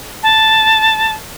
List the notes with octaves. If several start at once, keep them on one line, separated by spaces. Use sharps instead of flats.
A5